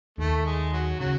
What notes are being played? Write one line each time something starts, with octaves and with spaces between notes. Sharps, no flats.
D#2 D#3 A3
G#3
F#3
C#3 F#3